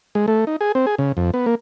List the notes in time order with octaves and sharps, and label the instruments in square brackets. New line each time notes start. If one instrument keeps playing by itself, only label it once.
[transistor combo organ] G#3
A3
D#4
G#4
C4
G#4
C#3
F2
B3
A#3